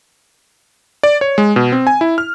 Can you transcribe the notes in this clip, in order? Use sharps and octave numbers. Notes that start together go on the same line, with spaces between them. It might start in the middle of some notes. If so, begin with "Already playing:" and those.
D5
C#5
G#3
B2
C4
G#5
E4
F6